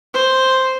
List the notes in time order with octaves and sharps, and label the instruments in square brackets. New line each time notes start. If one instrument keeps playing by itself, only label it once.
[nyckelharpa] C5